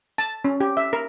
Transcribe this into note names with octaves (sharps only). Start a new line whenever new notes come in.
A5
C#4
G4
E5
A#4